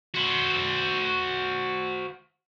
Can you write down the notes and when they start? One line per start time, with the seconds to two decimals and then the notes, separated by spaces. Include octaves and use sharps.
0.15 F#4 C5